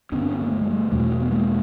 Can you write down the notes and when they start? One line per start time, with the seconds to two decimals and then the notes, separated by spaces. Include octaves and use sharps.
0.12 G2 D3 B3 C#4
0.22 C4 D4
0.32 B3 C#4
0.42 A#3
0.52 A3
0.61 G#3
0.70 G3 A3
0.91 E2 B2 G3 A3
1.22 B3
1.32 G#3 A#3